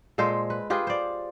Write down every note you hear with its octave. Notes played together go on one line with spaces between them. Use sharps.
A#2 G#3 A4 C5
B4
F4 G4 G#4 B4
C5 D5